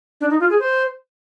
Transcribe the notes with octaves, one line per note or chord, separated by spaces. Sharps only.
D4
D#4
F4
G#4
C5